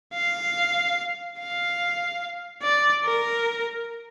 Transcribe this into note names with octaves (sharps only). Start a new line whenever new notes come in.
F5
F5
D5
A#4